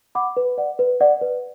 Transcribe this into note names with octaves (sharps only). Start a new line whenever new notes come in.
F#5 B5 D6
B4
D5 F#5
B4
D5 F#5
B4